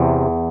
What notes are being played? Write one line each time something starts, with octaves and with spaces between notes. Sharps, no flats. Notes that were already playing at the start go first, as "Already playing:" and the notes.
Already playing: E2 C3